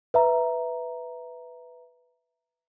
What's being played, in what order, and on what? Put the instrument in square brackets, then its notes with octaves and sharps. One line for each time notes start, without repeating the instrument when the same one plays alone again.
[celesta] B4 E5 A#5